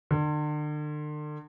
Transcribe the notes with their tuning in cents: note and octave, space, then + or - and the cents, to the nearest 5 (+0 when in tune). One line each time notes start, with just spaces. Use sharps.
D3 +40